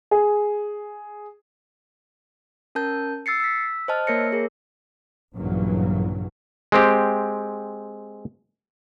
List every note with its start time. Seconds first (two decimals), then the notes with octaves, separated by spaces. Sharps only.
0.11 G#4
2.75 C#4 A#4 A5 G6
3.26 E6 A6 C7 C#7
3.40 E6 B6
3.88 C5 D#5 A5 F6
4.07 A#3 A#4 C#5 A#6 C#7
4.32 G#4 A#4
5.34 A#1 G2 A#2 C#3 E3 F#3
6.72 G#3 C4 G4